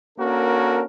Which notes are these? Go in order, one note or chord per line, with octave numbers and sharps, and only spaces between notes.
A#3 C#4 D4 F#4 A4 A#4